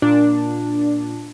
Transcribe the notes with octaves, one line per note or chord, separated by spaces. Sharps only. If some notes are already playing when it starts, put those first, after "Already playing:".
A#2 D4